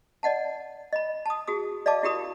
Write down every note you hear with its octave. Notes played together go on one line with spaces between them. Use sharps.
D5 D#5 F#5 A5
D#5 B5
A5 D#6
F#4 G#4 D#6
D5 D#5 F5 A5 D6
E4 F#4 G4 A#4 B5 D#6